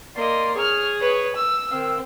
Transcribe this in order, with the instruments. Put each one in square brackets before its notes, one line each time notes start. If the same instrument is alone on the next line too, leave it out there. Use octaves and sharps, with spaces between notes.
[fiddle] A#3 D#5 [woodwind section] D5 C6
[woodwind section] G#4 [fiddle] C#5 F6
[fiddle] B4 C#5
E6
[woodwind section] D#3 F5 E6 [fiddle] C4